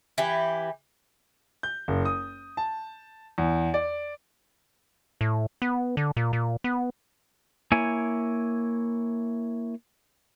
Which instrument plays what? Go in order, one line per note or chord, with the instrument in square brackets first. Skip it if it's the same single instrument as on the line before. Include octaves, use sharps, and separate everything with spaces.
[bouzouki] E3 G4
[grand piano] G6
F#1
D#6
A5
E2
D5
[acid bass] A2
B3
D3
A#2
A#2
B3
[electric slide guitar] A#3 E4 C#5 G#5